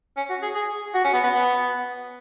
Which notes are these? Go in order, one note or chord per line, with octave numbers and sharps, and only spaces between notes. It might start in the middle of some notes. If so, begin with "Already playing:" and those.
C#4
F#4
G#4
G#4
F#4
C#4
B3
B3
B3